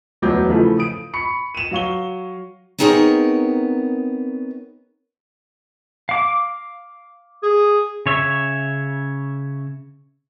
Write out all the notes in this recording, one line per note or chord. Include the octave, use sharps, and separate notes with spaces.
E1 D2 F#3 B3 D6 G6
C#3 E3 F3 A3
D#6 D7
B5 C#6 C#7
D#7 E7
F#3 F5 C#6 G7
B3 C4 D#4 G#4 A#4 C#5
F5 D6
G#4
C#3 C#5 E5